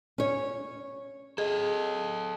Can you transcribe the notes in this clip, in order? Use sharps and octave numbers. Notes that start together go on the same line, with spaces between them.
C#4 C#5
G#4 A4 D#5